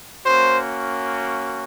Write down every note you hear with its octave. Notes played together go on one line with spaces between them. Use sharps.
A#3 C#4 F#4 C5